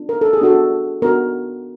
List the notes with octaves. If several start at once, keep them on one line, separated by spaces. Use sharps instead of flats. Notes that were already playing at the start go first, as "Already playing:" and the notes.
Already playing: B3 D4 F4
A#4
A4
G#4
B3 D4 F#4 A4
B3 D4 F#4 A#4